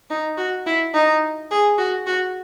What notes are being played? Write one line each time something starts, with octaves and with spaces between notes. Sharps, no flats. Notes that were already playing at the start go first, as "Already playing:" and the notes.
D#4
F#4
E4
D#4
G#4
F#4
F#4